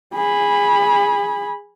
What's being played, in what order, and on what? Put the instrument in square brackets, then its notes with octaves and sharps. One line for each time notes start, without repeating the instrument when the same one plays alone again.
[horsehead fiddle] G#4 B5